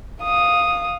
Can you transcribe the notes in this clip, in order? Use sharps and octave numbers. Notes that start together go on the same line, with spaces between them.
F5 D#6